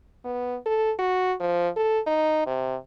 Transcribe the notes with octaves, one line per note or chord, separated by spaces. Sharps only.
B3
A4
F#4
F3
A4
D#4
C3